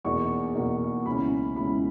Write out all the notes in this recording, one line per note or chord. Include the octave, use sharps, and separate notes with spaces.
E2 B2 A#3 D#4 C#6
E2 B2 A#3 D#4
C#2 B2 G#3 C#4 E4 B5
C#2 B2 G#3 C#4 E4 B5